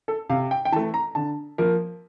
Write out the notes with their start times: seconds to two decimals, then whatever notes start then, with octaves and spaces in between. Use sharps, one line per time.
0.08 A4
0.29 C3 F5
0.51 G5
0.65 G5
0.72 E3 A5
0.76 A3
0.94 A#5
1.15 D3 A5
1.58 F3 A#3 A#4